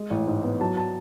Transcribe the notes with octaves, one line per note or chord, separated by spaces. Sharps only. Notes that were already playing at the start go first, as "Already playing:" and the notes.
Already playing: G#3
A1
G#2
B3
F#3 A5
A5